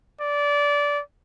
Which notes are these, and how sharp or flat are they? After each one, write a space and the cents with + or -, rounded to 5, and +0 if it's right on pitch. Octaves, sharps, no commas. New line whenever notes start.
D5 -20